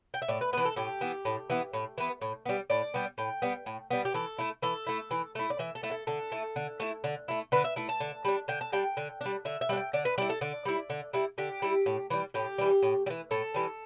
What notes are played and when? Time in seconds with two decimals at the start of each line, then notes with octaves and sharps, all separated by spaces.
0.14 G5
0.22 E5
0.28 A2 D5
0.41 B4
0.53 B3 B4
0.57 E3
0.65 A4
0.76 A2 G4
1.01 E3 B3
1.25 A2
1.50 E3 B3
1.73 A2
1.98 E3 B3
2.21 A2
2.46 G3 B3
2.70 A2 D5
2.94 G3 B3
3.18 A2 G5
3.42 G3 B3
3.66 A2
3.91 G3 B3
4.05 G4
4.14 E3 A4
4.38 A3 E4
4.62 E3 A4
4.87 A3 E4
5.11 E3
5.35 A3 E4
5.50 D5
5.59 E3 E5
5.75 A4
5.83 A3 E4
5.91 A4
6.07 D3 A4
6.32 A3 E4
6.56 D3
6.80 A3 E4
7.04 D3
7.28 A3 E4
7.52 D3 B4
7.64 E5
7.76 A3 E4
7.89 A5
8.00 D3
8.25 G3 D4
8.48 D3 G5
8.61 A5
8.72 G3 D4 G5
8.97 D3
9.21 G3 D4
9.45 D3 E5
9.61 E5
9.69 G3 D4
9.77 G5
9.93 D3 D5
10.05 B4
10.18 G3 D5
10.22 E4
10.29 A4
10.41 D3 D5
10.65 G3 E4
10.90 D3
11.13 G3 E4
11.38 D3 G4
11.62 G3 E4
11.86 A2
12.10 E3 G3
12.34 A2 G4
12.58 E3 G3
12.83 A2
13.06 G3
13.10 E3
13.31 A2 A4
13.54 E3 G3